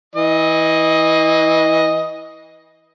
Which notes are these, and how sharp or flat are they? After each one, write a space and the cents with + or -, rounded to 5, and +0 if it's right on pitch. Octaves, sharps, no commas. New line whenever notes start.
E3 -20 D#5 +5